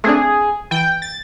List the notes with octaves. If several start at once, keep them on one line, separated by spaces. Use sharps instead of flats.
A3 C4 D4 G#4
E3 G5
A6